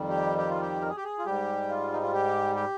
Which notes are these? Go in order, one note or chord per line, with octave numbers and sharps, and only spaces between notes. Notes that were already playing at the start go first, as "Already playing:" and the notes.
Already playing: F2 D#3 G3
G4
G4
F4
G4
A#4
G#4
G4
G#4
F4
G#2 G3 G4
F4
D#4
F4
G4
G4